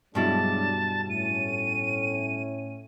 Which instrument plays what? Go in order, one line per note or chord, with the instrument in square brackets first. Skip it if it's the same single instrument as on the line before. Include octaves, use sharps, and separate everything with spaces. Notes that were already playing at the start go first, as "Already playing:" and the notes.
[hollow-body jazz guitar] G2 B2 E4 [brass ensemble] F#3 G#3 D4 [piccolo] A5
[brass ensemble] A2 C#4 [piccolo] D#7